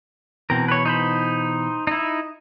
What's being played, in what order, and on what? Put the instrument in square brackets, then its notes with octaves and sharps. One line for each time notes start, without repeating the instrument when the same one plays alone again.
[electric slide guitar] B2 E3 [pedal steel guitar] C4 A#4
[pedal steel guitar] B4 C#5
D#4 C5 B5
D#4 E4